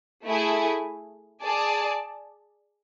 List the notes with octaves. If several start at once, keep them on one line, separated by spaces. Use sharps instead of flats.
A3 E4 G#4
G#4 D5 A5